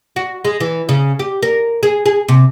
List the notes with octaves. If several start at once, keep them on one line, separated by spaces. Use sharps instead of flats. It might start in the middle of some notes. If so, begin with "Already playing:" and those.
F#4
G#3
E3
C#3
G4
A#4
G#4
G#4
C3